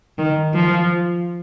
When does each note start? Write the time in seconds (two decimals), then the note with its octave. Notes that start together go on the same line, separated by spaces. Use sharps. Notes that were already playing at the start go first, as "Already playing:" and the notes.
0.18 D#3
0.53 F3